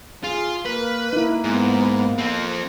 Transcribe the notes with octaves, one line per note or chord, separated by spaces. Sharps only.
F4 G#4
A#3 A#4 B4
A#3 D#4 E4
G#2 B3
F3 C4